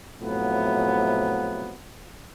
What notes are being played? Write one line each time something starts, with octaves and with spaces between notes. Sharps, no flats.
A2 C3 F3 F#3 B3